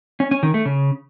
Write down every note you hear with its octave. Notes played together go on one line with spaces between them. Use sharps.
C#4
C#4
D#3
A3
C#3